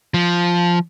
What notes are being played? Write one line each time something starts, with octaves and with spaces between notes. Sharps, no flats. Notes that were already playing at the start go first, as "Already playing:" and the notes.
F3